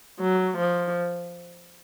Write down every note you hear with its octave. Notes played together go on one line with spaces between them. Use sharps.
F#3
F3